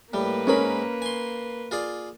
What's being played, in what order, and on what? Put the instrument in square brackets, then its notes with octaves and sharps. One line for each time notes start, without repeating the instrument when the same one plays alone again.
[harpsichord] A2 G3 [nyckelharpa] A#3 B4
[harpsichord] G#2 G#4 B5 [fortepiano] C#4 A#4
[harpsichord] G#5 C6
F4 G#4 D5